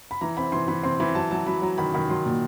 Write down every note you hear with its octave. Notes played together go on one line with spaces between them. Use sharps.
B5
E3 A#5
C4 B5
E3 C6
E3 B5
C4 C6
E3 B5
F#3 A5
F#3 A5
F#3 B5
F#3 A#5
D#3 B5
D#3 B5
F#3 C6
A#2